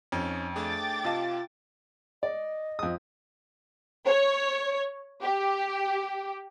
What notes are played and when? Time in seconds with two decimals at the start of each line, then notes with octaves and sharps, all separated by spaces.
0.12 F2 C#4 D#4
0.56 A3 D4 G#4 G5 D6 A6
1.05 C3 F4 D#5 F5 A5
2.23 D5 D#5
2.79 F2 D#6
4.07 C#5
5.22 G4